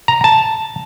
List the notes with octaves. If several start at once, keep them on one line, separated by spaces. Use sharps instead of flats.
A#5
A5